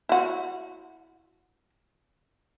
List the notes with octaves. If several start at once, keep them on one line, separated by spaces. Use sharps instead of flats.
E4 F#4